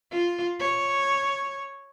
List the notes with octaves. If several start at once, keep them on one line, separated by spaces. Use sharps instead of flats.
F4
C#5